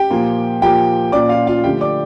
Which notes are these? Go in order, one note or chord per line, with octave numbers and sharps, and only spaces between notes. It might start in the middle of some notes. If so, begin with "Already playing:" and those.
Already playing: G4 G5
A#2 F3 A#3
A#2 F3 A#3 G4 G5
A#2 F3 A#3 C#4 D5 D6
F4 F5
F4 F5
D3 F3 A3 G4 G5
D5 D6